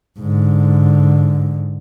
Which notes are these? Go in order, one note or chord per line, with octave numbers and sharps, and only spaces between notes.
G#2 D3